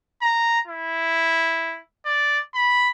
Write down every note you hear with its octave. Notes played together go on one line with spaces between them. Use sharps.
A#5
E4
D5
B5